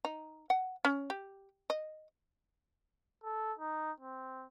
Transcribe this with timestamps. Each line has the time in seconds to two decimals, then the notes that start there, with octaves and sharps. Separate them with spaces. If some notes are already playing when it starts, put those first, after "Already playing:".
0.05 D#4
0.50 F#5
0.85 C#4
1.10 G4
1.70 D#5
3.23 A4
3.59 D#4
4.00 C4